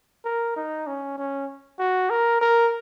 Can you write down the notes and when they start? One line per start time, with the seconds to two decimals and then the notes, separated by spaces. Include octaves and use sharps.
0.25 A#4
0.56 D#4
0.87 C#4
1.18 C#4
1.79 F#4
2.10 A#4
2.41 A#4